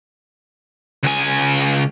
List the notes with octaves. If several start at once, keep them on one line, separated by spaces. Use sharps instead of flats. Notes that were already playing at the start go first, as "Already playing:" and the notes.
C#2 G#5